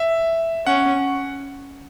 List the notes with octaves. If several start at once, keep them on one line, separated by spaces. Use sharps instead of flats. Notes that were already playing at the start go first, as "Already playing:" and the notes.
Already playing: E5
C#4 F#5